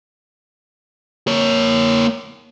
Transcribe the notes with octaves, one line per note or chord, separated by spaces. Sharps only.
A#3 C#5